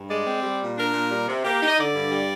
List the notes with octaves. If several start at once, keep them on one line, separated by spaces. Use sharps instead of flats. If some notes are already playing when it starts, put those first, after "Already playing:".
Already playing: G2
G#3 D5
C4
G3
A#2
D4 A#4
A#2
G3
C3
A#3 G4
D#4
D#5
D3 D5
G2
G3